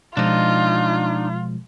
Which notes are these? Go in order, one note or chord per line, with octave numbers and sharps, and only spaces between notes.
B2 F3 G#3 D4 D#4 F4